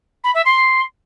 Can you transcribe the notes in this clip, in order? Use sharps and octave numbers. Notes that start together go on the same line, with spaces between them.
B5
E5
C6